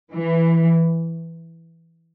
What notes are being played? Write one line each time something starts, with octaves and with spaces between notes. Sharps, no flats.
E3